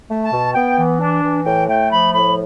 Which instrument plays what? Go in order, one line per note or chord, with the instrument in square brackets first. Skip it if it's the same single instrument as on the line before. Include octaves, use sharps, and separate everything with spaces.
[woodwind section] A3
A5
B2
B3 G5
E3
D4
E3
A2 G5
A3 G5
F3 B5
A2 B5